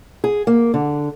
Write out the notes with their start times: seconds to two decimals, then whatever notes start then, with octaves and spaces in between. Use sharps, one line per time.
0.24 G#4
0.47 A#3
0.74 D3